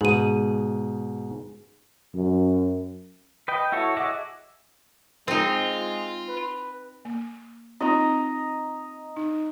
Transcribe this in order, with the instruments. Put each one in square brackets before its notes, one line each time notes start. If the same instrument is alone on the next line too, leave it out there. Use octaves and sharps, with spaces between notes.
[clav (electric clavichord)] G#2 B2 [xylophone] G#4 D#7
[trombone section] F#2
[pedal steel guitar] B4 D#5 G5
E4 F#4 A4 C#5
F#4 G#4 D#5 E5 D6
[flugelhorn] G#3 [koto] C4 D#4 [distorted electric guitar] F4
[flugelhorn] B4
[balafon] A#3
[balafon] C4 D#4 F4 [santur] D#5 A#5
[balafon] D#4